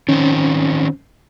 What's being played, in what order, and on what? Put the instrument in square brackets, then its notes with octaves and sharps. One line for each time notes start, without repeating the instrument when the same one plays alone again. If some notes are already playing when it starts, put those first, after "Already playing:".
[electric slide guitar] D#3 F3 C4 [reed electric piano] C#4